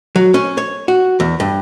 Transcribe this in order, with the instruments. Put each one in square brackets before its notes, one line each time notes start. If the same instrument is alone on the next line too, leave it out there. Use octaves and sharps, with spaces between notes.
[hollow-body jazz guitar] F#3
C#4
C#5
F#4
E2
G2